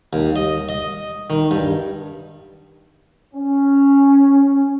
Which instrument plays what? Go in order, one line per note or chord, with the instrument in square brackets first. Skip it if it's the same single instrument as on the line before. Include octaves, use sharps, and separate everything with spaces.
[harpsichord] D#2
D#5
D#5
D#3
G2
[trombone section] C#4